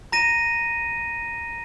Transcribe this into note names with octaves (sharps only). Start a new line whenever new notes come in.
A#5 A#6 D#7